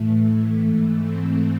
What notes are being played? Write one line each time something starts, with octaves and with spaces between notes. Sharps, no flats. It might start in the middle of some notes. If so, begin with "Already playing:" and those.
Already playing: A2 E3 A3
A3
G#2 E3
C4